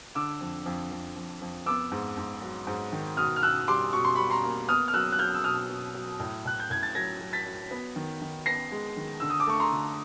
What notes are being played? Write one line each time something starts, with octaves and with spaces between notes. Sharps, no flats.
D3 D6 E6
F2
F2
F2
F2
F2
B3 D6 E6
G#2
G#2
F#3
G#2
D#3
B2 D#6 F6
F6
B2 E6 F#6
G3 C6 D6
B2 C#6
C6
G3 B5 C#6
A#5 C6
A#3
B3 D#6 F6
F6
F#3 E6 F#6
F#6
F#3 F6 G6
E6
B2 D#6 F6
B2
F#3
A2
A2 F#6
G6
A2 G#6
A6
F#3 G#6 A#6
F#3
A6 B6
F#3
B3
D#3
D#3
B3 A#6 C7
G#3
D#3
D3 E6
D#6
D6
A3 C#6
A#5 C6
D3